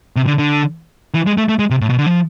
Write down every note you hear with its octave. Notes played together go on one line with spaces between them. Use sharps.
C3
D3
D3
E3
G#3
A3
A3
G#3
C3
A2
B2
D3
F3